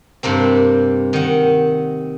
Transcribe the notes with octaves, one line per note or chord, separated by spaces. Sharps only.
G2 C3 A#3 C4
D#3 F#5